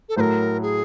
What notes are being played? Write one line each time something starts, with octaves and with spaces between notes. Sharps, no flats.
A4
A2 F#3 A3 A#4 C5
G#4